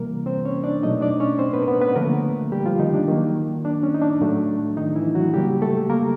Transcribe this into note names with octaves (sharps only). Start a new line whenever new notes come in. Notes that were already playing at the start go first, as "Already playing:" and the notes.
Already playing: C3 E3 G3 A#3 A#4
C4 C5
C#4 C#5
D4 D5
B2 F#3 A3 D#4 D#5
D4 D5
C#4 C#5
C4 C5
B3 B4
A#4
B3 B4
B3 B4
D3 F3 A3 A#3 A#4
G3 G4
F3 F4
D#3 D#4
D4
D#3 F#3 A#3
D4
C#4
D#4
D4
A2 F#3 A3
D#3 D#4
E3 E4
F#3 F#4
C#3 F#3 G3 A#3 G4
A3 A4
A#3 A#4